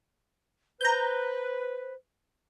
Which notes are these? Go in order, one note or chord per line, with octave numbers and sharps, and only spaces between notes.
B4 C5 A#5 G6